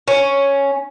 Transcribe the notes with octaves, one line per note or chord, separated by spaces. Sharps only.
C#4